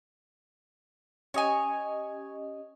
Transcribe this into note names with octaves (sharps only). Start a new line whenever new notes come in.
C#4 G4 C#5 D#5 G#5